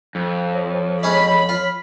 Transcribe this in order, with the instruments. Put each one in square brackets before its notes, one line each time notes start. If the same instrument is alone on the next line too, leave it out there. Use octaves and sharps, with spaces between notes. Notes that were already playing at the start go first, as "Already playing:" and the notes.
[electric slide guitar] F2
[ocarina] C#5
[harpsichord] G#3 C#4 D#4 [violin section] B5
[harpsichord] F4